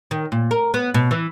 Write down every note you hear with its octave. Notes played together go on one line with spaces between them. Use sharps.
D#3
A#2
A#4
B3
B2
E3